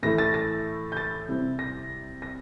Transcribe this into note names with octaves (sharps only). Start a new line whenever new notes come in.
A2 E3 A3 E4 A#6
A6
A6
G6
A6
C3 G3 C4 E4
A#6
A#6